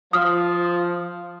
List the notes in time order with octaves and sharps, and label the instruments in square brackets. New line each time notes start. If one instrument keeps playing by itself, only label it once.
[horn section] F3 [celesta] D#6 F6